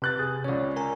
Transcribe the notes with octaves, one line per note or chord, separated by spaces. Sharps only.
C3 B4 F#6 A6
G#4
C#2 C#4 C#5 D5
A#4 G#5 A#5